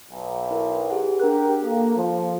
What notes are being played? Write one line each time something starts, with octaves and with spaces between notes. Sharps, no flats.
B1
E4 A#4 B4
G4 G#4 F#5
D4 G4 A#4 F#6
A#3 A4
F3